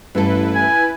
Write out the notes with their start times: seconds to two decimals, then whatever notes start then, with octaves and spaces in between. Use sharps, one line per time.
0.15 A1 G2 E4 A4 B4
0.55 G#5